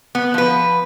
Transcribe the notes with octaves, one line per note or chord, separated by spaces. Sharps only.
B3
F3 B4